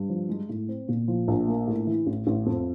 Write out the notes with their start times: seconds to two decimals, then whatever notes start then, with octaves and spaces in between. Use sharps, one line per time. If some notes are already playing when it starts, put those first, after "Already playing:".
Already playing: G2
0.09 F3
0.29 G#3
0.49 A2
0.69 C4
0.88 A#2
1.08 F3
1.28 A#1
1.48 A#3
1.67 A2
1.87 E3
2.07 A1
2.27 A1
2.46 F2